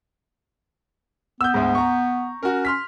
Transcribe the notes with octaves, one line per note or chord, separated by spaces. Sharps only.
B3 E6 G6
D2 G#2
A#5 C#6
C#4 F#4 A#4
C6 F6 B6